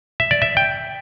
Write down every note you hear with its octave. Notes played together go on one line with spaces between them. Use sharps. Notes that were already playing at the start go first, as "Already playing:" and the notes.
E5
D5
E5
G5